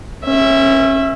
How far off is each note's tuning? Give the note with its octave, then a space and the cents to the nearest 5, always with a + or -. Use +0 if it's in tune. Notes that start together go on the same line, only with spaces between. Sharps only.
C#4 -30 E5 +0